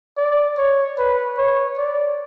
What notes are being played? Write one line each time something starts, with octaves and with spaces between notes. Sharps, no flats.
D5
C#5
B4
C#5
D5